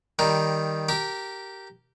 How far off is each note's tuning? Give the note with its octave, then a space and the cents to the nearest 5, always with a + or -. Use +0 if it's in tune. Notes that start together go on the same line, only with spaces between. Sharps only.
D#3 +0 G3 +0 A#4 +0
G4 -15 A#4 -10